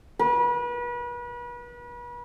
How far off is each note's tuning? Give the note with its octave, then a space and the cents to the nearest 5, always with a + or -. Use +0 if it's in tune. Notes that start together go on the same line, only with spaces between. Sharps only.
B4 -35